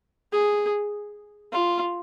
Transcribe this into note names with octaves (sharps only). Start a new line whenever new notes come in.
G#4
F4